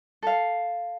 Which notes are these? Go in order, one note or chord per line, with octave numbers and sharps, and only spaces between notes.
A4 F5